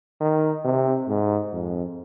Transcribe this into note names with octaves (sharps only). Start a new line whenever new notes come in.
D#3
C3
G#2
F2